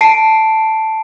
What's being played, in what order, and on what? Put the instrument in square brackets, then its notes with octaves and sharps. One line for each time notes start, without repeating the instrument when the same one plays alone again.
[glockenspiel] A5 C7 D7